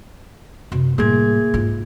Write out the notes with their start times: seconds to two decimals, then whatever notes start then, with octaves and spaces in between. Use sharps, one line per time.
0.72 F#2 C3
0.98 A2 G3 A#3 G#4 G#6
1.54 G#2 F4